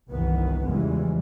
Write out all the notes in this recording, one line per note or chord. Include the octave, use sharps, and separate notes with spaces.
G1 C2 D#3 E3 B3
E2 C#3 E3 F3 G3 G#3